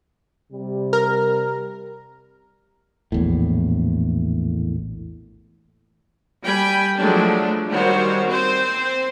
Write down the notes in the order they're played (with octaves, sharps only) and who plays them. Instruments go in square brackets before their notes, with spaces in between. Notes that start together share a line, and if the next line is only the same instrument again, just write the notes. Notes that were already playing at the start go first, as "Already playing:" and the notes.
[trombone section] C3 G3
[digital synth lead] A#4
[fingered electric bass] A#1 E2 A2
[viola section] G3 G5 G#5 B5
F3 F#3 G#3 A3 D4
D#3 G3 F#4 C5 C#5
C4 C5